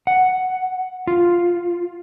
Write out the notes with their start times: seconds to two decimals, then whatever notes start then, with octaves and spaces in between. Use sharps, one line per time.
0.07 F#5
1.07 F4